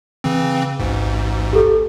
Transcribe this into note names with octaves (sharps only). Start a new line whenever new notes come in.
C#3 E3 C4
A1 D2 G#2
G4 A4